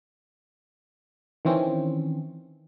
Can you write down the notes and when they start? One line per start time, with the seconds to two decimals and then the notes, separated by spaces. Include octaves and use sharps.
1.45 D#3 E3 C4 C#4